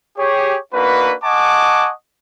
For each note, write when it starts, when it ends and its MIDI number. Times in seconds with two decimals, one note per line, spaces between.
0.18 0.58 67
0.18 0.58 68
0.18 0.58 73
0.74 1.14 58
0.74 1.14 62
0.74 1.14 63
0.74 1.14 66
0.74 1.14 71
1.24 1.90 75
1.24 1.90 78
1.24 1.90 80
1.24 1.90 81
1.24 1.90 85
1.24 1.90 86